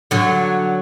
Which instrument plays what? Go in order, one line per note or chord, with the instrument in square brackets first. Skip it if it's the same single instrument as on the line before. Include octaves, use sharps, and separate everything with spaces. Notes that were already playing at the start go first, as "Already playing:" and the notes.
[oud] D3 F#3